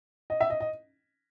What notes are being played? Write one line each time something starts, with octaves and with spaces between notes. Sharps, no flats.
D#5
E5
D#5
D#5